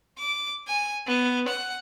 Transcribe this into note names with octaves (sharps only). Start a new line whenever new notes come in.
D6
G#5
B3
F#5